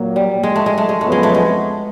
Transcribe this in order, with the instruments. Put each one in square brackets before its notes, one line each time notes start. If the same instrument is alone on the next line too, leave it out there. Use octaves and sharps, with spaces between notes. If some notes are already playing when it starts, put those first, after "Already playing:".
Already playing: [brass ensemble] A#2 F#3 A#3
[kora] G3
G#3
A3
G#3
A3
G#3
[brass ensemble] F2 C#3 F#3 B3 [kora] A3
[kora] G#3
A3
G#3